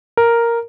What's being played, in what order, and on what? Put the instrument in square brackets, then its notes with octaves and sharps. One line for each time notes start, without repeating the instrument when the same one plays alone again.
[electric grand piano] A#4